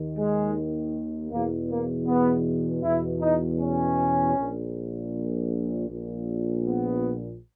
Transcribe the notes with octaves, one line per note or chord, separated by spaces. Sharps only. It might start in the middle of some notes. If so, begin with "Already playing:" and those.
Already playing: D#2 D#3
G#3
E2 B2 A#3
A#3
B3
E2 B2 E4
D#4
C#4
A#1 A#2
A#1 A#2
B3